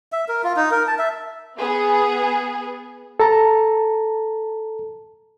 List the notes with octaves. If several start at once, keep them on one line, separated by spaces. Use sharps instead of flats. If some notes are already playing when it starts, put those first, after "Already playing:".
E5
A#4
F4
D#4
A#4
A5
E5
B3 G#4
A4 A5 A#5